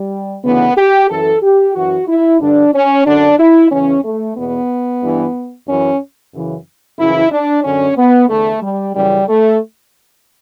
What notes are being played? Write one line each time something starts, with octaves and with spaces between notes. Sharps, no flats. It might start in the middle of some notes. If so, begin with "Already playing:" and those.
Already playing: G3
D2 C#3 E3 B3
G4
F#2 E3 A4
G4
F#2 E3 F#4
E4
G2 D3 D4
C#4
F#2 D3 D4
E4
E2 C#3 E3 C#4
A3
E2 B2 B3
G2 E3
F#2 E3 C#4
F#2 C#3 E3
F#2 C#3 E3 E4
D4
F#2 D3 C#4
B3
E2 D3 A3
G3
F#2 C#3 E3 G3
A3